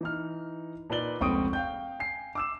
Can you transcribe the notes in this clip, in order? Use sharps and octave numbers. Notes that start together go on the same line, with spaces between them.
E3 D#4 F6
A#2 D#4 B4 D5 F#7 G7
F1 C#2 C4 C#6 D#6 D7
F5 G5 G6
G#5 C7
D6 E6 E7